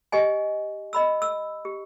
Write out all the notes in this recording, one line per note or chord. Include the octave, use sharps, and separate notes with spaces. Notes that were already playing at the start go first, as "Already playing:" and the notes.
G4 D#5 G#5
D#5 B5 E6
E6
G4